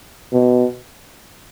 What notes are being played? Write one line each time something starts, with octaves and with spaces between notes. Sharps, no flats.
B2